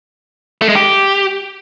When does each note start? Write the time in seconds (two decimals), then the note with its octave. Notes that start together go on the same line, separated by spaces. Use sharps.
0.62 A3
0.69 G#3
0.76 G4